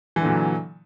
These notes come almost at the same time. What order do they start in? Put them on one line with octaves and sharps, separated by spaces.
E3 D3 A#2 F#3